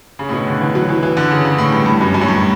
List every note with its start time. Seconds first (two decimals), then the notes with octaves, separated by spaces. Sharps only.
0.19 C#3
0.29 A2
0.33 B2
0.47 D3
0.61 E3
0.75 F#3
0.89 E3
1.03 E3
1.17 D3
1.31 C#3
1.45 C#3
1.58 A2
1.72 G2
1.86 G2
2.01 F#2
2.14 F#2
2.21 A2
2.28 G2